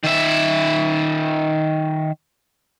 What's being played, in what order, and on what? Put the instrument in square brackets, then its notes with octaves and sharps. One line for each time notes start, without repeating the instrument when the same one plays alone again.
[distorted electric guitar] D#3 E5